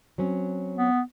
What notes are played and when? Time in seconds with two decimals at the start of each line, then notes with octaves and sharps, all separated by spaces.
0.18 F#3 C4 C#4
0.78 B3